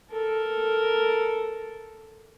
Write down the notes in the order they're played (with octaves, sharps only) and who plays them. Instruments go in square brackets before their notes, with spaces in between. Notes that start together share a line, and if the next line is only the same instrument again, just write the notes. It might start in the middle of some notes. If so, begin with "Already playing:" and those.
[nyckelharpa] A4 A#4